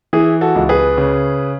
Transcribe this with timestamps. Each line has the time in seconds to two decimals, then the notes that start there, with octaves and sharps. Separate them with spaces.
0.13 E3 E4 G#4
0.41 F#4 A4
0.55 C#2
0.69 G#4 B4
0.98 C#3